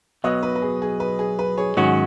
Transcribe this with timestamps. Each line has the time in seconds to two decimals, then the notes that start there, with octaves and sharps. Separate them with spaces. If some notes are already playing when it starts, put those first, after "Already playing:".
0.24 B1 B2 F#3 B4 D#5
0.43 B4
0.55 B4
0.62 G#4
0.82 G#4
1.00 B4
1.19 G#4
1.39 B4
1.58 G#4 C#5
1.77 G#2 D#3 F#3 C#4 F#4 G#4 C#5